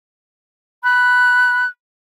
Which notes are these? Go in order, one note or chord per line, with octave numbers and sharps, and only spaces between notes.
B5 F#6